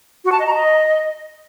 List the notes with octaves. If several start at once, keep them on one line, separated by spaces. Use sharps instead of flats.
F#4
A5
D#5
A#5
D#5